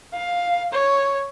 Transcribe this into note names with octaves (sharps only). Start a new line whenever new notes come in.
F5
C#5